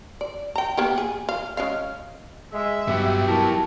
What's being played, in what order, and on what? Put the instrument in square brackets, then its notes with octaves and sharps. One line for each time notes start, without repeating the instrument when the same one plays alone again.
[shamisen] D5
G5 A#5
A#3 B3 G4
G#4
F5
G#3 C#4 F5
[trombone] G#3 [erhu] E5
[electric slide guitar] G2 [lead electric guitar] F#3 B3 [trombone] G4
[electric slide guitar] E4 F#4 A#4 [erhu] A5